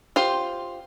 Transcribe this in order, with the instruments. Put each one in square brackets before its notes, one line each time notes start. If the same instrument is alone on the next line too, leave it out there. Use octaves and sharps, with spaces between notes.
[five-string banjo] F4 G4 C5